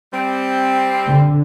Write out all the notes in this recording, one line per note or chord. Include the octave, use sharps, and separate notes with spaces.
G3 C4
D3